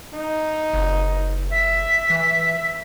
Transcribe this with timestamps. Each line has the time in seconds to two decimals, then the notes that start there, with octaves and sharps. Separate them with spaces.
0.14 D#4
0.73 F#1
1.52 E5 B6
2.10 E3